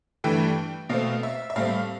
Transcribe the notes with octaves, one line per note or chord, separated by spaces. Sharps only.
G2 E3 A3 G5
B2 A3 C4 F5
E5
E5
A2 G3 C4 F5